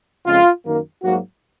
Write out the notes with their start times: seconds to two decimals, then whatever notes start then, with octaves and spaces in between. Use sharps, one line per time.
0.25 F2 C#3 G#3 F4
0.64 F#2 D#3 A#3
1.02 G#2 F#3 A#3 F#4